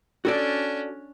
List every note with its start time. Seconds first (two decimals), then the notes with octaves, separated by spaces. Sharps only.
0.25 C#4 D4 F#4 A4 D5